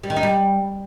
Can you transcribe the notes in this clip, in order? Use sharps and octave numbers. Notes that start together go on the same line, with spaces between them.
G3
D#3
D#4
G3